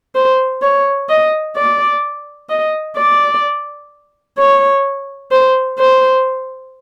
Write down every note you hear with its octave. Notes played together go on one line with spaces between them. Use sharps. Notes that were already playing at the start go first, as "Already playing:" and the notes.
C5
C#5
D#5
D5
D#5
D5
C#5
C5
C5